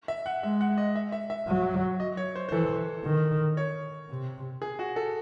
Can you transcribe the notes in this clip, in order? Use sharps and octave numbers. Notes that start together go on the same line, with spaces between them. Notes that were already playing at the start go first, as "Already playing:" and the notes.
E5
F#5
G#3 E5
F#5
D#5
E5
E5
E5
F#3
D#5
C#5
C5
C5
E3 A4
D#3
C#5
C3
G#4
F#4
A4